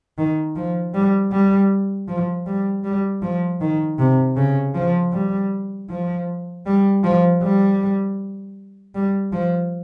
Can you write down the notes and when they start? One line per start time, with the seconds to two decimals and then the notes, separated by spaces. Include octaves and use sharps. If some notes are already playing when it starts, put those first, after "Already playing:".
0.18 D#3
0.56 F3
0.94 G3
1.32 G3
2.08 F3
2.46 G3
2.84 G3
3.22 F3
3.61 D#3
3.99 C3
4.36 C#3
4.74 F3
5.13 G3
5.90 F3
6.66 G3
7.04 F3
7.42 G3
8.95 G3
9.32 F3